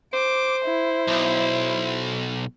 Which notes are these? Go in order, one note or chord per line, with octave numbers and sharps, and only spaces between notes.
C5 D6
E4
B1